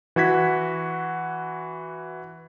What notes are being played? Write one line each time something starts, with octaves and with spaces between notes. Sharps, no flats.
E3 F#4 G#6 B6